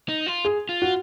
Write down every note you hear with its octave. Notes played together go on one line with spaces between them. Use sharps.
D#4
F4
G#4
F4
F#4